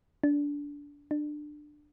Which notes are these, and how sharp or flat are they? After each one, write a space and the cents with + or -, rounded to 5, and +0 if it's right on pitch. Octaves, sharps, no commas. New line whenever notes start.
D4 -20
D4 +20